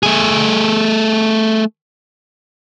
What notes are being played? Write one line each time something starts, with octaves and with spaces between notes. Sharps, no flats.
A3 G#4